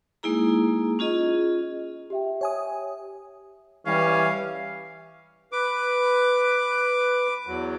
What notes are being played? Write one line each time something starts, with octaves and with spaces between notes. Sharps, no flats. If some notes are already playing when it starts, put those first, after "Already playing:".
G#3 A#3 D#4 E4 G#4 A#5
C#4 F4 G#4 D#5
G4 E5 G5
C#5 G#5 D#6
E3 G3 C#4 F5
B4 D6
E2 F#3